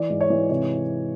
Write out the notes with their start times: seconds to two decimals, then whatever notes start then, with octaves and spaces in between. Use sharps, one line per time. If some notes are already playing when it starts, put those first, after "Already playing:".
Already playing: E3 D5
0.10 G#2
0.21 C#5
0.30 E3
0.49 C3 C#5